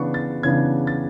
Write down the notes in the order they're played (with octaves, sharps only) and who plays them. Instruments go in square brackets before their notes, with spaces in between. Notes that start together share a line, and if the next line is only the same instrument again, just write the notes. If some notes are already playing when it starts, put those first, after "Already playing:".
Already playing: [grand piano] C#3 E3 B3 D4 C#6
A6
C#3 E3 B3 D4 G#6
A6